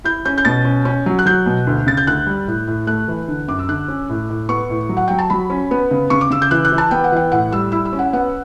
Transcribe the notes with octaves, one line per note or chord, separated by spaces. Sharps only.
E4 G6
C#4 G6
G6
B2 A6
C#4
C#4
F#3
F#6
F#3 G6
B2
D2
C#3 A6
G6
D2 F#6
G3
A2
A2
A3 F#6
E3
D3
F#2 D6
E6
D3 F#6
C#4
A2
A2
B3 C#6
A2
F#3
F#5
F#3 G5
A5
F#3 B5
C#4
B3
C#3
C#3 C#6
D6
C#3 E6
G6
E3 F#6
F#6
E3
A5
B3 G5
F#5
E3 G5
A2 F#5
G3 E6
E4 E6
E6
C#4
F#5
B3 F#5